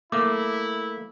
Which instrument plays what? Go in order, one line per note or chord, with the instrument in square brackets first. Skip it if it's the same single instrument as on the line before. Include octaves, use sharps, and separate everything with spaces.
[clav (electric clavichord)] A3 A#3 [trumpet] E4 [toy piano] D6